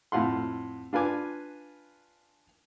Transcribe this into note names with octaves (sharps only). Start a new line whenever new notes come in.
F2 A2 F4 F#5 C6
D4 F4 B4 G#5 D6